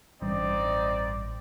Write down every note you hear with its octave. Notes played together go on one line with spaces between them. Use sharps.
A1 G2 C4 D#4 D5